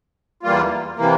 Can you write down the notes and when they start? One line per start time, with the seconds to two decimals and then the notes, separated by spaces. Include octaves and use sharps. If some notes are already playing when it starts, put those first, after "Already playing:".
0.43 E2 E3 G3 A#3 F4
0.96 C3 E3 A#3